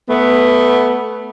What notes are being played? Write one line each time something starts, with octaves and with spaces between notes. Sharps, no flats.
A3 B3